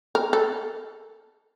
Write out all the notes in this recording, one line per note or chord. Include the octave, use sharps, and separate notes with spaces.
A#4
A4